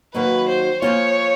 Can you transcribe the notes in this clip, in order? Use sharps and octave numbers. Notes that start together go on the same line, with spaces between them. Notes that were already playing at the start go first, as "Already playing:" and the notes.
D#3 F#3 A#3 D#4 F#4 B4
C5
F3 A#3 C#4 F4 C#5